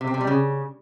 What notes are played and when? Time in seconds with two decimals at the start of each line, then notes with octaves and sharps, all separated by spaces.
0.01 C3
0.07 C4
0.14 C3
0.21 G3
0.27 C#3